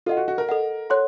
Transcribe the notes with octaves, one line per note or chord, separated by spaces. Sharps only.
F4 A4 D#5 F#5
F#4
F#4
A#4
A4 D#5 F#5
A4 C#5 F#5 C6 F#6